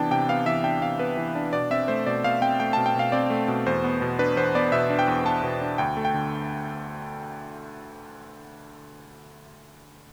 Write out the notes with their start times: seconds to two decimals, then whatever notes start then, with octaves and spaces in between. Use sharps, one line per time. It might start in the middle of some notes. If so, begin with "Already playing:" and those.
Already playing: C3 E3 B3 D4 G5 A5
0.11 C3 G5
0.29 B3 F5
0.46 E3 E5
0.64 D4 G5
0.82 C3 F5
0.99 B3 B4
1.17 E3
1.35 D4
1.53 B2 D5
1.70 C4 E5
1.88 A3 C5
2.06 B2 D5
2.24 B2 F5
2.42 C4 G5
2.60 A3 G5
2.73 B2 A5
2.86 G5
2.95 B2 F5
3.12 C4 D5
3.30 A3
3.48 B2
3.66 E2 C5
3.84 B3
4.02 B2
4.19 D4 B4
4.36 E2 C5
4.55 B3 D5
4.72 B2 E5
4.90 D4
4.99 G5
5.08 E2
5.25 B3 A5
5.43 B2
5.62 D4
5.78 D2 G5
5.97 A3
6.05 G5
6.14 D3